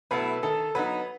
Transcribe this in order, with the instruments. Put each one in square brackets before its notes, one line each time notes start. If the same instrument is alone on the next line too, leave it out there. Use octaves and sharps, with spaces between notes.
[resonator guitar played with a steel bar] B2 F#3 A3 E4 [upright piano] B4
[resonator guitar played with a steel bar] D#3 [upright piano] A4
[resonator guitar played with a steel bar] F#3 B3 D#4 [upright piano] B4